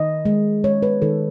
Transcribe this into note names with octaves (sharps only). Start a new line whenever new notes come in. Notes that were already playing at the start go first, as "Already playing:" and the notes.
Already playing: D#3 D#5
G#3
G#3 C#5
B4
D#3 A4